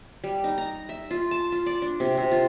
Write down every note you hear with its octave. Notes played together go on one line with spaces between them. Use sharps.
G3
D#4
A#5
E5
F4
A5
F4
D5
D4
C3
C3
F4